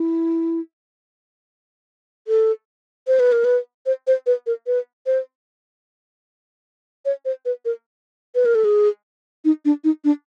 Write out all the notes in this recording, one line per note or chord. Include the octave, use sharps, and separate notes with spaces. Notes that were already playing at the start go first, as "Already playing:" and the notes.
Already playing: E4
A4
C5
B4
A#4
B4
C5
C5
B4
A#4
B4
C5
C#5
C5
B4
A#4
B4
A#4
A4
G#4
D#4
D4
D#4
D4